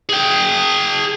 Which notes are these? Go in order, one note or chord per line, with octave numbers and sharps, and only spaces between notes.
G#4 G5